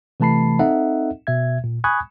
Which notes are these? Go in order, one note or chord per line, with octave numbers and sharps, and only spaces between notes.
C3 E3 A3 A5 B5 C7
C4 D#4 A4 D#5 E5 F#5
B2 E5 G#6
A#2
G#5 B5 C#6 D#6 F#6 G#6